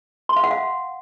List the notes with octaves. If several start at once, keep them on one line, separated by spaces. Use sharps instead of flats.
C6
F5
F#5
F5